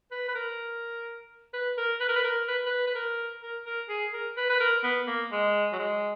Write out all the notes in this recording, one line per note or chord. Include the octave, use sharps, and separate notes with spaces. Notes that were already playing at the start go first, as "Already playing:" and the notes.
B4
B4
A#4
B4
A#4
B4
A#4
B4
A#4
B4
B4
B4
A#4
A#4
A#4
G#4
A#4
B4
B4
A#4
B3
A#3
G#3
F#3
G#3